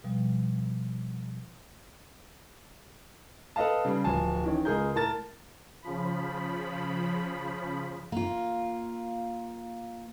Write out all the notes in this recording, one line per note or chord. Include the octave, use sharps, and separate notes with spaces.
B2 F3 G3
A4 B4 D#5 F5 A5
C#3 G3
D1 F3 G#5 A5
D#3 E3 C#4
C#2 G#3 G#4 A#4 G6
A2 A#4 A5 A6
C#3 F3 B5
A#3 F4